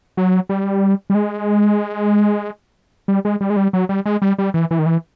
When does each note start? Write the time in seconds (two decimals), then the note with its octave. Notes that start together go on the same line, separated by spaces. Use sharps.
0.17 F#3
0.49 G3
1.10 G3
1.15 G#3
3.08 G3
3.25 G#3
3.41 G3
3.50 G#3
3.56 G3
3.73 F#3
3.89 G3
4.05 G#3
4.22 G3
4.38 G3
4.54 E3
4.71 E3
4.79 D#3
4.86 E3